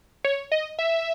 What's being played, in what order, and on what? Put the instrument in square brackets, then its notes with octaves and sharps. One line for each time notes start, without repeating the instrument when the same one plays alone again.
[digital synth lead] C#5
D#5
E5